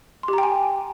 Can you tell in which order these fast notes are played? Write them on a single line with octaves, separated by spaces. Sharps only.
C6 G4 A#5 G5 G#5